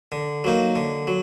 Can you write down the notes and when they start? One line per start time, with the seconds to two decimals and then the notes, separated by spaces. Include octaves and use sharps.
0.12 D3
0.44 F#3 A#3 D#4
0.76 D3
1.07 F#3